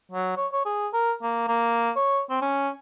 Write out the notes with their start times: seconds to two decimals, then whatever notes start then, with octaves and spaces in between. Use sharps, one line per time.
0.12 F#3
0.37 C#5
0.53 C#5
0.65 G#4
0.94 A#4
1.22 A#3
1.48 A#3
1.96 C#5
2.30 C4
2.42 C#4